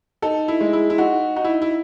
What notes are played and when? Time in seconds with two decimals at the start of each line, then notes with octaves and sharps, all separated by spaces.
0.22 D#4 A4
0.48 E4
0.61 G#3
0.73 E4
0.90 E4
0.98 D#4 F#4
1.36 D#4 F#4
1.44 E4
1.62 E4